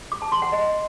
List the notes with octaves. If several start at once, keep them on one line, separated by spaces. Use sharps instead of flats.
D6
A5
C6
F#5
D#5